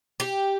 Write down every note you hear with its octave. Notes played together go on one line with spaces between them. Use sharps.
G4